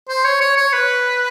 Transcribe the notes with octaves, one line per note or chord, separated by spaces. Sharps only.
C5
C#5
C#5
C#5
B4